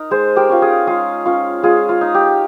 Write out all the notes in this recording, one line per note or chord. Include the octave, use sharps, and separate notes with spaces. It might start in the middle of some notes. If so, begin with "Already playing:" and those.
Already playing: D#4 A#4 D#5
G#3 G#4 C5
G4 A#4
C#4 F4
F4 G#4
G#3 F4 G#4
C#4 F4
G#3 F4 G#4
F4
D#4
G4